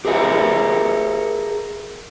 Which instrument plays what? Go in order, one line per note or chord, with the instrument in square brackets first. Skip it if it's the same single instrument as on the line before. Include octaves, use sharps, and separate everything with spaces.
[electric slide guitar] G4 G#4 A#4 C#5 E5 F#5